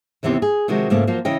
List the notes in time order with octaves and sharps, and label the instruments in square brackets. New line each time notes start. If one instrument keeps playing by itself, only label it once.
[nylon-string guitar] D#2 C3 E3 B3 C4 G4
G#4
C3 D#3 F3 G#3 F#4
G#2 C#3 A3 A#3 F4
F3 F#3 A#3 F4
C#3 E3 C#4 D#5 G5